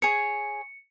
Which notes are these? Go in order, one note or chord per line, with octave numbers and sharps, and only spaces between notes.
G#4 C#5 C#7